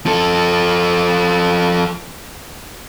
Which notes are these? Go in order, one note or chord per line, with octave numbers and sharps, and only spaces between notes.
F3 A4